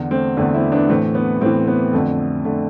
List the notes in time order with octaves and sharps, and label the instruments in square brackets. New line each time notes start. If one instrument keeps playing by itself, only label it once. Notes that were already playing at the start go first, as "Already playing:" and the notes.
Already playing: [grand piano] E2 D3
A3 C4
E2 D3 A3 C4
C4 E4
B3 D4
A2 E3 A3 C4
B3
A2 A3 C4
E3
B3
F2 D3 A3
D3 A3